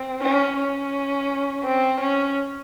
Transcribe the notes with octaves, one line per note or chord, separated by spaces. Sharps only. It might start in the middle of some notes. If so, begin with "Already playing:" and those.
Already playing: C4
C#4
C#4
C4
C#4